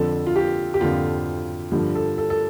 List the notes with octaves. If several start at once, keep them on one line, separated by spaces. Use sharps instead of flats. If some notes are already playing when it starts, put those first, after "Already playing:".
Already playing: F2 D3 F3 A4
F4
G4
G4
F2 D3 F3 F4
G2 D3 F3
A4
A4
A4